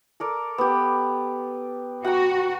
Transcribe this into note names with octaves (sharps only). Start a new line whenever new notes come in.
A4 A#4 D5
B3 G4
F#4 F#5 G5 A#5